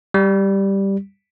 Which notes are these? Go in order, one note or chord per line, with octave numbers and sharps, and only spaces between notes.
G3